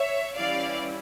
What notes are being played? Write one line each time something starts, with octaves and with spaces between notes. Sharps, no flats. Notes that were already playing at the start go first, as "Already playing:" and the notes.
Already playing: C#5 E5
E3 G3 C#4 E4 D5 F5